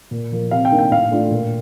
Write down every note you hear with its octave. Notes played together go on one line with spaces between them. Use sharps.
A#2
F3 A#3
C3 F5
G5
D#3 A#3 D4
G5
A2 F5
A3 D4 F4
A#2